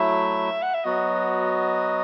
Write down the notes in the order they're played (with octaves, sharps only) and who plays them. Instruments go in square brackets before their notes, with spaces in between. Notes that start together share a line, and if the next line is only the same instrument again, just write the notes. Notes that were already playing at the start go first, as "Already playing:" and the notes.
Already playing: [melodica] F#3 A3 E4 [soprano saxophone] E5
[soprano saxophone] F#5
E5
[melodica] F#3 B3 F#4 [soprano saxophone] D#5